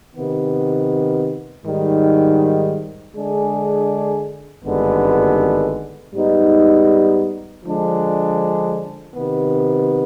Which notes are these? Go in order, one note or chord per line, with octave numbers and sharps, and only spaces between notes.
C3 D#3 B3
G#2 D#3 G3
D3 G#3 D4 G#4
G#1 G2 D3 G#3 B3
G#2 G3 B3 D#4
D3 F3 G#3 D4
C3 D#3 B3